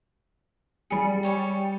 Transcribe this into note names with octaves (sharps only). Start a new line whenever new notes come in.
G3 G#4 C#7
G4 C#5 D5